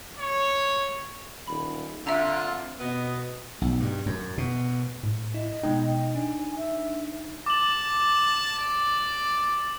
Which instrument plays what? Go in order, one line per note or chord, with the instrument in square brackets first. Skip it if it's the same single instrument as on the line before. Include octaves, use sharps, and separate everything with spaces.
[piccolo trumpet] C#5
[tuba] D#1 [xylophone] B5
[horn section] D3 F4 [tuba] C4 [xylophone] E5 A#5
[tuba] B2 [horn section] B3 D#5
[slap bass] B1
G2
F#2
B2
[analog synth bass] A2
[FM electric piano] E4 [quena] D#5
[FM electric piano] B2 G#3 G5 [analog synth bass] D#4
[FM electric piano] D4 [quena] G#5
[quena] E5
[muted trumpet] A5 [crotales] D6 F#7
[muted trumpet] D5